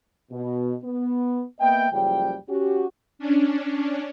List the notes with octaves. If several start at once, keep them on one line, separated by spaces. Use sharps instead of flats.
B2
B3
A#3 B3 D#5 E5 G5
F#1 C#2 F3 G3 G5
C#4 F#4 G4
C#4 D4